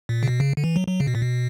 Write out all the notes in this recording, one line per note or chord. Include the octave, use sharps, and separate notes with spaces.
A#2
C#3
B2
C#3
D3
E3
F#3
F#3
C#3
B2
A#2
B2